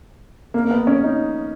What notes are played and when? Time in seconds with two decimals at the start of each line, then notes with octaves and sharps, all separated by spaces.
0.54 A#3
0.65 A#3
0.71 B3
0.87 C#4
1.04 D#4